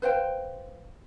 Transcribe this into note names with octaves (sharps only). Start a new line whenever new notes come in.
B4 C5 F5 G5